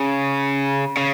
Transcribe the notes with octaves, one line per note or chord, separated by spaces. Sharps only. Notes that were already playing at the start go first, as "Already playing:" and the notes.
Already playing: C#3
C#3